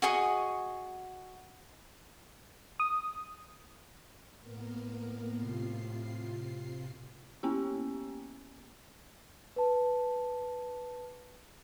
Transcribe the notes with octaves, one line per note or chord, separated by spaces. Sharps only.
F#4 G#4 D#5 C#6
D#6
A2 A#3 B3 A#4
C3 F4 C7
A#3 B3 C#4 E4 G4
B4 A5